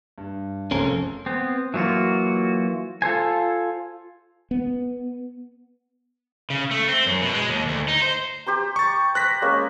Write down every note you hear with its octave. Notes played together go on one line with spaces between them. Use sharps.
G2
F1 F2 C#4 G#4 A#4
B3 C4
E3 F#3 A#3 F4 F#4
F4 A4 C5 G#5
B3
C#3
A3
C4
F#2
B2
G#3
D#2
D2
D#4
C5
G4 C5 A#5
C#6 A6
C5 F#6 A#6 B6
G#3 A#3 C#4